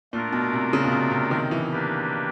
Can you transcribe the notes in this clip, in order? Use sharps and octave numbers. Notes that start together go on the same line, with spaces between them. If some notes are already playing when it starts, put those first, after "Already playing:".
A#2 A3 D4 F4 A#4
B2
C3
C#3
B2
C3
C3
D#3
E3
A#3 D4 G4 B4